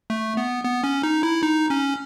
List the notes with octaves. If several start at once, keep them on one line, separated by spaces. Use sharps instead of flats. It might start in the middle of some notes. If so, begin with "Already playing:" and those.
A3
B3
B3
C#4
D#4
E4
D#4
C#4